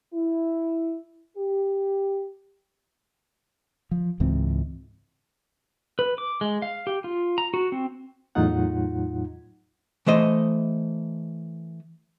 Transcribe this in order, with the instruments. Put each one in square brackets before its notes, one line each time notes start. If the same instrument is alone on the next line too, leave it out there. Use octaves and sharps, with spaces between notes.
[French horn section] E4
G4
[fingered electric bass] F3
C#2 G#2 E3 C4
[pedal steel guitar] B4
D6
G#3
F5
G4
F4
A#5
F#4
C4
[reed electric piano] E2 A2 F#3 D#4 F4 F#5
[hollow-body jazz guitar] E3 A3 C5 D#5